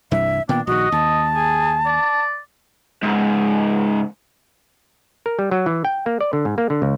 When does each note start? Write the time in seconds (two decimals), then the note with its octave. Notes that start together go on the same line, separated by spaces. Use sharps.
0.11 C2 G2 E3 E5
0.49 A#2 D#3 B3 D4 G5
0.67 A#1 D#3 F#4 D#5
0.92 D#2 A5
1.35 G#4
1.86 D5
3.03 C#2 G#2
5.26 A#4
5.39 G3
5.51 F#3
5.66 E3
5.85 G5
6.06 A#3
6.21 D5
6.33 D3
6.45 G#2
6.58 A#3
6.70 D3
6.82 C#2